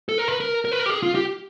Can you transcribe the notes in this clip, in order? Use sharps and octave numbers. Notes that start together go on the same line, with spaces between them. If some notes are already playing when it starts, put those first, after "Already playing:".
A4
A#4
B4
A#4
A#4
B4
A#4
G4
G#4
F4
G4